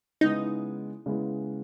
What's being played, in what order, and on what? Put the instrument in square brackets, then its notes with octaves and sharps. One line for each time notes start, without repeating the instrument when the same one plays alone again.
[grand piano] C#3 G#3 B3 E4 [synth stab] D#4
[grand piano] C#3 G#3 B3 E4